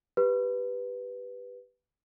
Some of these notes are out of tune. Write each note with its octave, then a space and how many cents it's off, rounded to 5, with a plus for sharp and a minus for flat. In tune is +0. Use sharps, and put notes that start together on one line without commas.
G4 +0 B4 +0